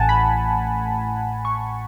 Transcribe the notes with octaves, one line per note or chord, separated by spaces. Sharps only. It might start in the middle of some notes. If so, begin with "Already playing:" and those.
Already playing: A1 A2 F#5 G#5 A5
B5
C#6